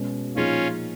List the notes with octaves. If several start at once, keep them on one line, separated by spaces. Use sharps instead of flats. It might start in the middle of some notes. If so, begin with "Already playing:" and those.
Already playing: B2 G#3 C#4
A#2 F3 A#3 C#4 D#4 F4 G#4